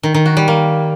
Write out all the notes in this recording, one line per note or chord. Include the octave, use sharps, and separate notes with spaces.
D#3
D#3
F#4
G3
A#3